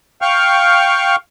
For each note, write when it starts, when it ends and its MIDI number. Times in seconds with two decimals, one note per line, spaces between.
0.22 1.16 77
0.22 1.16 79
0.22 1.16 85
0.22 1.16 89